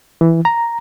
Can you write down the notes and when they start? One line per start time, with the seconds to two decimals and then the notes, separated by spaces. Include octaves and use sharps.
0.21 E3
0.45 A#5